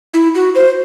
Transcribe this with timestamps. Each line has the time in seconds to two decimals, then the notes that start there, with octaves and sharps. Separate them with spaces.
0.14 E4
0.35 F#4
0.55 C5